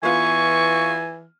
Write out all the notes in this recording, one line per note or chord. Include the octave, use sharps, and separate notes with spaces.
E3 B3 F4 G#5 C#6